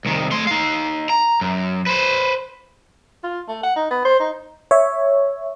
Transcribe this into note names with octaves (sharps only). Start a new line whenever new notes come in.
C2 D#3
A3 C6
D#4 F5
A#5
F#2
B4 C5
F4
A3
F#5
D#4
B3
C5
D#4
C#5 E5